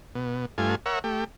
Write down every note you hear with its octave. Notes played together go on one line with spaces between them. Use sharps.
B2
G2 A3 F4 G#5
A#4 C#5 E5 F#5
A3 G4